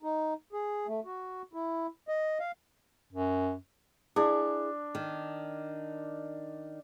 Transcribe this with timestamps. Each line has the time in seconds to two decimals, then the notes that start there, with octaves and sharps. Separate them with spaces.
0.03 D#4
0.53 G#4
0.87 A3
1.05 F#4
1.53 E4
2.08 D#5
2.40 F5
3.12 F#2
4.16 D4 E4 G#4
4.95 D#3